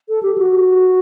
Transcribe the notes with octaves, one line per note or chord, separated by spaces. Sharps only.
A4
G4
F#4